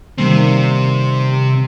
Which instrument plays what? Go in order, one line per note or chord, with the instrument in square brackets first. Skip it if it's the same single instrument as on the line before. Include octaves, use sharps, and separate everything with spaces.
[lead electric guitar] C3 C4 [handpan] D#3 G3 A#3